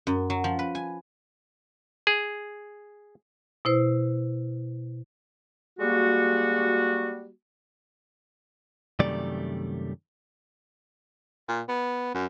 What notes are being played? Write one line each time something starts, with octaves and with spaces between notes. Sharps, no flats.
F#2
F#3
F3
B4
G#5
G#4
B2 E4 C5
G3 G#3 A#3 F#4
F#2 C3 D#3 G3 A3 D5
A#2
B3
F#2